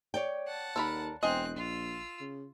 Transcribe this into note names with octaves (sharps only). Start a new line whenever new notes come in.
C#5 D5 G5
F#5 A5
D#2 A4 A#4 B5
E1 C4 D#5 G#5 F#6
A#1 F4 E6
C#3